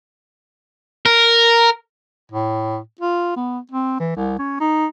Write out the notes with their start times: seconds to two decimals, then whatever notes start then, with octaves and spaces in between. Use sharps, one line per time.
1.06 A#4
2.32 A2
3.01 F4
3.36 B3
3.72 C4
4.00 E3
4.16 C2
4.39 C#4
4.60 D#4